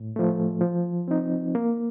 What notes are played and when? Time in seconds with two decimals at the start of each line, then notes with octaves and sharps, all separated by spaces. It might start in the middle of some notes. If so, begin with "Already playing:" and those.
Already playing: A2
0.16 F3 A3
0.61 F3
1.08 C4 D#4
1.55 A#3